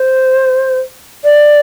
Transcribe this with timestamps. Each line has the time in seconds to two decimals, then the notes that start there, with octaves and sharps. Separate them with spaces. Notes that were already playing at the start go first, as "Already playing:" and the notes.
Already playing: C5
1.24 D5